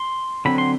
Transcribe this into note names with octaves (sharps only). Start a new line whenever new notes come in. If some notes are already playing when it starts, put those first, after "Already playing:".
Already playing: C6
D3 F#3 C4 B5
C6